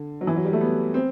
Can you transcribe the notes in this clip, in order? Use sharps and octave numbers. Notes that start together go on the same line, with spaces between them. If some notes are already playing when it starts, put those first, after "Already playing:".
Already playing: D3
F#3
E3
F#3
G3
A3
B3
C4